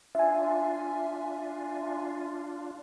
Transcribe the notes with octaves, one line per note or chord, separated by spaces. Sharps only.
D4 F4 E5 G#5